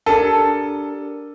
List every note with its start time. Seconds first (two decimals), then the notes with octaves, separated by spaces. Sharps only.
0.06 D4 G4 A4 A#4